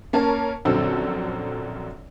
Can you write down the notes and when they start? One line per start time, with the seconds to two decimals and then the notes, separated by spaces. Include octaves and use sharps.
0.13 A#3 C#4 A#4 C#5 A5
0.65 A#1 F#2 D3 C4 A4 E6